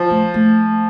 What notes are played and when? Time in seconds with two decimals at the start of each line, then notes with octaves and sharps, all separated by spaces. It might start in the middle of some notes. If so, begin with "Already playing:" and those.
Already playing: F3
0.10 A3
0.34 A3